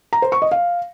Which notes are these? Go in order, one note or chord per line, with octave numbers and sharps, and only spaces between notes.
A#5
C5
C#6
D#5
F5